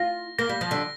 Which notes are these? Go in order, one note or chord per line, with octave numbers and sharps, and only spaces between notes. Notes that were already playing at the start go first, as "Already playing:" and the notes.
Already playing: F4 A#6
A#3 A#6
G3
F3
D3 G3